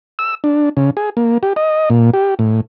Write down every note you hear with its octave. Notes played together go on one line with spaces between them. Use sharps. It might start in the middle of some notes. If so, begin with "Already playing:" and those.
E6
D4
C#3
G#4
A#3
G4
D#5
A#2
G4
A2